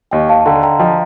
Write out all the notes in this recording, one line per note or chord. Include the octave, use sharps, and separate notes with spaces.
D#2 D#5 G5
F5 A5
D3 G5 A#5
G5 A#5
F3 D#5 G5